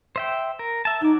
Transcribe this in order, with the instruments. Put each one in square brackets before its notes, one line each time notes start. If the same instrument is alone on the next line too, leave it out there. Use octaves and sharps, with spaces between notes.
[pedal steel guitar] C5 E5 G5
A#4
E5 A5
[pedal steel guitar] F#3 D6 [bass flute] D#4